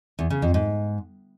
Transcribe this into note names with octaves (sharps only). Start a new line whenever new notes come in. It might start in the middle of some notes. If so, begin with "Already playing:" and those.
E2
C#3
F2
G#2